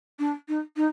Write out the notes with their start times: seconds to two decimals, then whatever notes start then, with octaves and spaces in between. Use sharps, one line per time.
0.19 D4
0.48 D#4
0.77 D#4